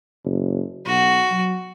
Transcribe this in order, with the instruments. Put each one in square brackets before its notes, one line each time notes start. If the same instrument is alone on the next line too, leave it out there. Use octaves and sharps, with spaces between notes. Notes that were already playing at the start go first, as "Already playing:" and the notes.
[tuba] F#1
[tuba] B1 [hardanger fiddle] F#4
[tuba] F#3